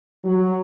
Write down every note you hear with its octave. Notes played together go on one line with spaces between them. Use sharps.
F#3